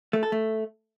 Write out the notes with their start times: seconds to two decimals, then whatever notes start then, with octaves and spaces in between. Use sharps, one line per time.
0.13 A3
0.23 A4
0.32 A3